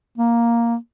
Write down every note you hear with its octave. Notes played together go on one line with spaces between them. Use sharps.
A#3